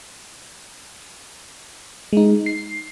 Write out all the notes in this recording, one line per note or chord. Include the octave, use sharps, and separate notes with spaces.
G#3 D#4
C7